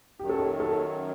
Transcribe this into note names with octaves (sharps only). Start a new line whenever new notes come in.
F#2 D#3 F#3 G4
A4
G4
A4